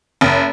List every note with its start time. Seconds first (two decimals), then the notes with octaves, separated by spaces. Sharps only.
0.21 F#1